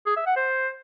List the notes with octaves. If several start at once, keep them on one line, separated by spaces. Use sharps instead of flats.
G#4
E5
F#5
C5